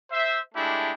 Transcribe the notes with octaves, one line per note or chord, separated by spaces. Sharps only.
C5 E5
G#3 A3 D4 E4 G4